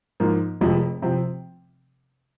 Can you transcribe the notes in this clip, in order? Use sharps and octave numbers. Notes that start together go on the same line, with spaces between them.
G#2 F3 A#3
F1 F2 C3 F3 G#3
C3 F3 C4